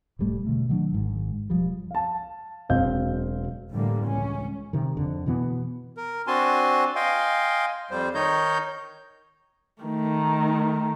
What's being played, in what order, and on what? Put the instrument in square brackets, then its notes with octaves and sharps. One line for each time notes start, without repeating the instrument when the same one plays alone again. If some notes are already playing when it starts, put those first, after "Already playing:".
[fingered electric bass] E1 G#2 G3 A3
B2 D3 A3
D#3 F#3 D4
G#1 G#2 D#3
E1 F3 G3
[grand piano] F5 A5
E1 F#3 C4 D#5 F5 G6
[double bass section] A2 D3 E3 G3 A#3
C#2 C#4
[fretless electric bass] C3 D#3
F2 D3
B2 E3 B3
[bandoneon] A#4
C4 D4 F#4 G#5 A5 C6
D#5 F5 G5 G#5 C6
F2 G3 C5
D#3 D#4 C#5 D#5 G6
[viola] D#3 A3